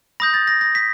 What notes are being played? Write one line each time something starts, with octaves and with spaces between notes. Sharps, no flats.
B5 D#6 G6 A#6
A6
A#6
A#6
B6